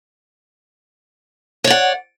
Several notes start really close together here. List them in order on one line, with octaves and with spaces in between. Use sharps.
C#5 D5 F#5